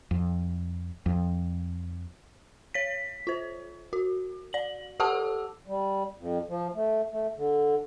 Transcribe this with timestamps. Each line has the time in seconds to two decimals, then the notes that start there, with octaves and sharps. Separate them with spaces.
0.11 F2
1.06 F2
2.74 C#5 B6
3.27 F4 C5
3.93 F#4
4.53 D5 F#7
5.00 G4 A4 F#5 A5 D6 E6
5.67 G3
6.18 F2
6.49 F3
6.74 A3
7.12 A3
7.36 D3